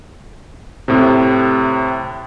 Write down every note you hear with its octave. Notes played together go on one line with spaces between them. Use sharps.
A2 C3